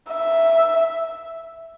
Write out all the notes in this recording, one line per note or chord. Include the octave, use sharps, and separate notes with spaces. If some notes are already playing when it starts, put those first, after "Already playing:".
E5